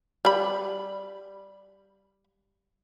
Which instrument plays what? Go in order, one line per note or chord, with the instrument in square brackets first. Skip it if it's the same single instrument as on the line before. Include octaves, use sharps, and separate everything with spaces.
[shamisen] G3 B5